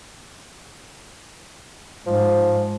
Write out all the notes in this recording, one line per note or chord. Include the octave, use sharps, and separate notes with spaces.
G#2 F3